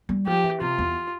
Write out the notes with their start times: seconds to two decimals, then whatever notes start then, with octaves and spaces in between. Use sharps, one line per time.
0.09 G3
0.26 F3 G4
0.44 E3
0.61 C3 F4
0.79 E2